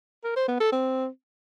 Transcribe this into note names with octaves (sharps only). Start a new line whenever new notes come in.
A#4
C5
B3
A4
C4